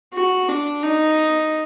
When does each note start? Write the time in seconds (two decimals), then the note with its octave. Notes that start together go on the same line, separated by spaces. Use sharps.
0.13 F#4
0.48 D4
0.83 D#4